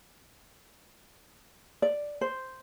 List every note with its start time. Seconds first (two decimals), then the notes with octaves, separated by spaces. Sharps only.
1.82 D5
2.21 C5